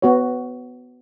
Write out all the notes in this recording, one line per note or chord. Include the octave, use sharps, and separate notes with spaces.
B3 F#4 C#5